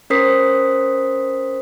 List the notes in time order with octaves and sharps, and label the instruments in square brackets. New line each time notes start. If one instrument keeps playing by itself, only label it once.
[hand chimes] C#4 A#4 C5 D#6 B6 C7